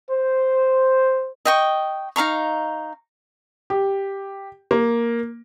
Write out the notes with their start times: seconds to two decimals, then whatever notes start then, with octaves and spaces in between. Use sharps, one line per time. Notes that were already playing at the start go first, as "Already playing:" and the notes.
0.11 C5
1.45 D#5 G5 C#6
2.16 D#4 F5 A#5 C#6
3.70 G4
4.71 A#3